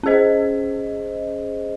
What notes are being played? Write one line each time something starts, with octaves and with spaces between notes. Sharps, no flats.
C#4 G#4 C5 D#5